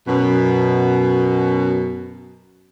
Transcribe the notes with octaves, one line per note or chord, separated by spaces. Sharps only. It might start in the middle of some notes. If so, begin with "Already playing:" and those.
F#2 B2